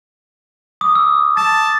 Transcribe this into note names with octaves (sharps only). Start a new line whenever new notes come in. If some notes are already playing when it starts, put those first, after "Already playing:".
D6 D#6
E6
A5 A6